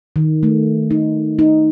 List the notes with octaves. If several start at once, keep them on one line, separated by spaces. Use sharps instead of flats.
D#3
A3
D#4
D#4